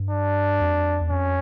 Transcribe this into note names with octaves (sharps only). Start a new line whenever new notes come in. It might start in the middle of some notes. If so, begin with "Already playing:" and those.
Already playing: G2
D4
F2
E2
F2 C#4